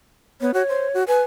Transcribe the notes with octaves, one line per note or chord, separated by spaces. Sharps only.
B3 C#5
F#4 C#5
C5
F#4
B4 G#5